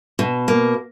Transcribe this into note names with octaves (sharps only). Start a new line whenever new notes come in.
B2
A#3